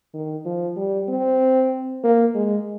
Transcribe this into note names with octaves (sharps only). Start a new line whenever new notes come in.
D#3
F3
G3
C4
A#3
G#3